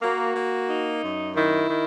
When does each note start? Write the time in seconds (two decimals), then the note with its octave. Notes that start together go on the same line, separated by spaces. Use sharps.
0.01 A#3 F#4
0.35 A#3
0.69 D#4
1.03 F#2
1.35 D#3 E4
1.70 D#3